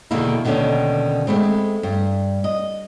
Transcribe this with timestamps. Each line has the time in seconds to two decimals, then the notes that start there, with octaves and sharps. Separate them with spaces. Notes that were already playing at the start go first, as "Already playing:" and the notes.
0.11 E2 B2 D3 D#3 A#3 E4
0.45 D#2 B2 D3 D#3 C#4 D4
1.27 G#3 A3 B3 C4
1.83 G2
2.44 D#5